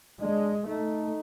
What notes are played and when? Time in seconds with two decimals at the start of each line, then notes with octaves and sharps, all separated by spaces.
0.21 G#3 D4
0.66 A3 D#4